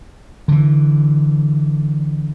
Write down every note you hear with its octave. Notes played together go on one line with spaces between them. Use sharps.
D3 E3